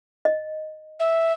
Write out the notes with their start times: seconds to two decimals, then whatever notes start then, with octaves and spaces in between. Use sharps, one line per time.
0.25 D#5
0.99 E5